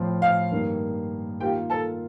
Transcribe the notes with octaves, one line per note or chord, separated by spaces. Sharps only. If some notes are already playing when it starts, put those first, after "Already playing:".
Already playing: A2 F3 C4
F5
G2 D#3 A#3
D#3 A#3 F4 G4 G5
A4 A5